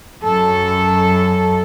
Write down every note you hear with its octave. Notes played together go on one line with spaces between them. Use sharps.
F#2 A4